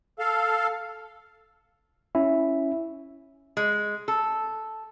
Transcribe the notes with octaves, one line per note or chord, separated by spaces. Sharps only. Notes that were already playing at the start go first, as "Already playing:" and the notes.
A4 F5
C#4 E4 E5
G#3
A4